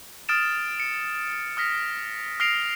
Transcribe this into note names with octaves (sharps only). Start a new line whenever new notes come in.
D#6 F6 A6 D7 E7
C#7
D#6 F6 A#6 B6
D#6 F6 A#6 C7 D7 F7